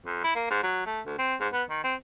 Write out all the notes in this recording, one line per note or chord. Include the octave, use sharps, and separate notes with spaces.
F2
E4
A#3
G#2
F#3
A3
D2
C4
G#2
B3
D#3
C4